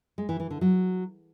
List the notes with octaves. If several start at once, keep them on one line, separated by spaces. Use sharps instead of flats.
G#3
E3
E3
D3
F#3